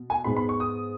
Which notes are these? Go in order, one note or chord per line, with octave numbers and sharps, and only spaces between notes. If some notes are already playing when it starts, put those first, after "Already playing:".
Already playing: B2
G#5
G#2 G#3 B3 B5
B5
C#6
D#6